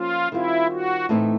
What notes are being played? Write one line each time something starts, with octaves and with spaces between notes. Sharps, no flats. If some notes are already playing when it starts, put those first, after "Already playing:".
Already playing: F3 A#3 C#4 F4
D#3 G3 C4 E4 F4
F#4
A2 E3 A3 C4 D#4